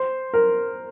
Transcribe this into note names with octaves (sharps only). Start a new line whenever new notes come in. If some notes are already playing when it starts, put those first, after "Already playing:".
Already playing: C5
A#4